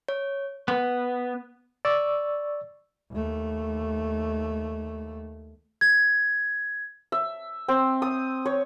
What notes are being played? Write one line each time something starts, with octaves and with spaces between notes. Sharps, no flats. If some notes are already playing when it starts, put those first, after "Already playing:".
C#5
B3
D5 C#6 E6
D#2 A3
G#6
E5
C4
D#6
C#5